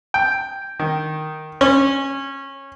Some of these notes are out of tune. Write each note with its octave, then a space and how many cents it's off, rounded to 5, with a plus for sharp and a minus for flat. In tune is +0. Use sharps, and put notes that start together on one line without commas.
G5 +5
D#3 -5
C#4 -20